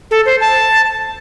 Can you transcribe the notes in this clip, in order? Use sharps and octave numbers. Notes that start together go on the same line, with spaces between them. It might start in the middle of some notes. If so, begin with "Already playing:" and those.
A4
C5
A5